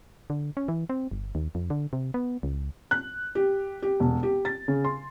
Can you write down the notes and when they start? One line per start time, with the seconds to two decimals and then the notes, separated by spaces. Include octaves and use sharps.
0.30 D3
0.57 C#4
0.68 E3
0.89 C4
1.11 G1
1.35 D#2
1.55 F2
1.70 D3
1.93 C3
2.14 B3
2.43 C#2
2.91 F#6
3.35 G4
3.83 G4
4.00 E1
4.23 G4
4.45 A6
4.68 C#3
4.84 C6